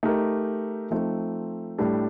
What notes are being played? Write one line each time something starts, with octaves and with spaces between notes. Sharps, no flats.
A3 D#4 G4 A#4
F3 A3 C4 D#4
A2 G3 D4 A4